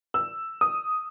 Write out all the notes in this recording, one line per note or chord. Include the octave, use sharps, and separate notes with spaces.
E6
D#6